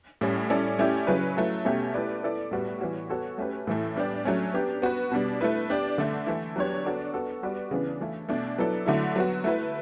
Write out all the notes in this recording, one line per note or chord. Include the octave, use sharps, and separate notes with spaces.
A2 G3 C#4
G3 C#4 E4 A4 D5
A3 C#4 E4 G4 D5
C#3 F#3 C#4 E4 B4
F#3 A3 E4
B2 A3 C#4 G4
A3 E4 G4 B4 D5
B3 E4 A4 D5
A2 G3 B3 F#4
E3 G3 B3 F#4 C#5
B3 F#4 A4 C#5
A3 C#4 G4 B4
A2 E3 A3
G3 B3 D4 G4 D5
F#3 A3 C#4
B3 D4 G4
B3 F#4 B4
B2 G3 D4
A3 E4 B4
B3 D4 G4 D5
D3 A3 D4
E3 A3 E4
F#3 B3 D4 G4 C#5
B3 D4 F#4 A4 D5
B3 F#4 A4
G3 B3 F#4 B4 D5
C#3 E3 B3 D4
E3 A3 E4
B2 A3 D4
F#3 B3 E4 A4 D5
D3 F#3 A3 E4
F#3 B3 F#4
A3 E4 B4